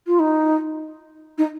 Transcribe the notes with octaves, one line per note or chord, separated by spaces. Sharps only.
F4
D#4
D#4